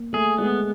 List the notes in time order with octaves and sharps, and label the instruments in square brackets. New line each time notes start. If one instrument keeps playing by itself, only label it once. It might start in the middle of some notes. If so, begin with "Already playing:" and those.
Already playing: [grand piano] A#3
[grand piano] A3 [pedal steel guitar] G#4
[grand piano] G#3 [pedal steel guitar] B3